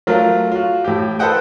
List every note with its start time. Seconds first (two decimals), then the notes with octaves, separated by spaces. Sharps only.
0.07 F#3 A3 F4 A#4
0.52 F4 F#4
0.84 A2 G4
1.19 A4 B4 C5 D#5 F#5 G5